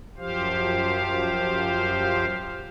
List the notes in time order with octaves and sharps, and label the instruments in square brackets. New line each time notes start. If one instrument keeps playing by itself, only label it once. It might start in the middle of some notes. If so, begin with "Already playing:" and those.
[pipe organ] F#2 F3 G4 C5 F5